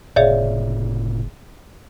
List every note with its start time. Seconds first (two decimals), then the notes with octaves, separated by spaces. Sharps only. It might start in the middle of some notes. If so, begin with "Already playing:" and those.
0.16 F#1 A2 C3 G#4 C#5 D5 E5 F5